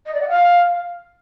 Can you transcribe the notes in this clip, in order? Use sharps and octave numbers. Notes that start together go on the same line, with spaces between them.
D#5
D5
F#5
F5